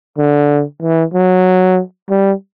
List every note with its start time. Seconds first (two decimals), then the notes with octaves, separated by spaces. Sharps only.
0.18 D3
0.81 E3
1.13 F#3
2.10 G3